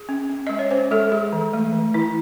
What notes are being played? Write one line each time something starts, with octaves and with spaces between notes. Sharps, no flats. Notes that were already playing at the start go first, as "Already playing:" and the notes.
Already playing: G#4
C#4
C#4
G#3 D#5
C#5
C#4 C5
G#3 A4
G#3 G#4
E3
A3
E3
E3 E4